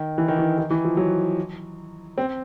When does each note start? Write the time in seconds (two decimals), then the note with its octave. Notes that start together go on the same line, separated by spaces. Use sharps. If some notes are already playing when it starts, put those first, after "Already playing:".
Already playing: D#3
0.18 E3
0.28 D#3
0.38 E3
0.58 D#3
0.70 E3
0.85 F3
0.97 F#3
2.18 C4